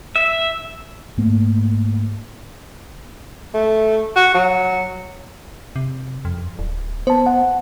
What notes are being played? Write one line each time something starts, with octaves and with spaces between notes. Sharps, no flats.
E5
G#2 A3 A#3
A3
F#4
F#3
C3
F2
D1
B3 C5 A5
F#5